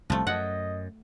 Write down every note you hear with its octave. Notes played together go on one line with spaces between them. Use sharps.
C2 F3 A3
F#2 D#5 F#5